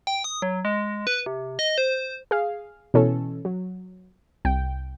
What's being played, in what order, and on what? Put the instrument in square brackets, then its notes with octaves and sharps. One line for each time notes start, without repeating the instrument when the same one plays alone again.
[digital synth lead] G5
D#6
F#3
G#3
B4
C3
D#5
C5
[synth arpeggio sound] G#4 F5
B2 E3 C#4 A4
F#3
C2 G5